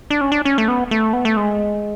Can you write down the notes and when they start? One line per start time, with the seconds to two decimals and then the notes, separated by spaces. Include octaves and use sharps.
0.10 D4
0.21 C#4
0.32 D4
0.45 C#4
0.58 A3
0.68 B3
0.91 A3
1.13 B3
1.25 A3
1.37 G#3